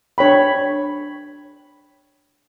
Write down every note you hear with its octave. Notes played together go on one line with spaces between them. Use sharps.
D4 C#5 G5 B5